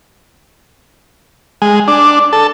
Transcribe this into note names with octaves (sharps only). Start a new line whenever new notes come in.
G#3
D4
A4